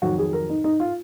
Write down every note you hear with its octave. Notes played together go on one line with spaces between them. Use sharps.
F2 D#3 F#3 F#4
G#4
A#4
D#4
D#4
F4